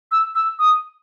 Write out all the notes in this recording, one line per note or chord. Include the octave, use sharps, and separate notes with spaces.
E6
E6
D#6